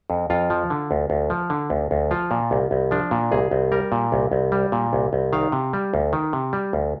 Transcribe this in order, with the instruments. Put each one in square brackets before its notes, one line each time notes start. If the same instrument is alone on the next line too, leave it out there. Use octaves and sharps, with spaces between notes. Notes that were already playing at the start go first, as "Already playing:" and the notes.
[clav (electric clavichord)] F2
F2 F4
F3
D3
D2
D2
F3
D3
D2
D2
F3 F4
A#2
C2
C2
F3 D4
A#2
C2 G#4
C2
G3 A#4
A#2
C2
C2
G3
A#2
C2
C2
D#3 F5
C3
G3
D2
D#3
C3
G3
D2